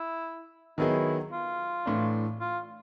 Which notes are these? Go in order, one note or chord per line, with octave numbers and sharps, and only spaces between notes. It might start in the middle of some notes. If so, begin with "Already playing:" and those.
Already playing: E4
D#3 F#3 B3 D#4 E4 G#4
F4
A2 E3 A3 D4
F4